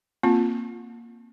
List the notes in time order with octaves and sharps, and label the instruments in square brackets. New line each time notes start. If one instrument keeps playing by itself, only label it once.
[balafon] A#3 C4 F4